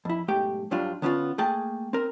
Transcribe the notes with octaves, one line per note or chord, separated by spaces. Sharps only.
F2 E4
B1 G#2 A3 G4 G5
G2 F#3 G3 D4 F4
D3 B3 C#4 D4 F4
A3 A#3 G#4 G5 A5
C4 A#4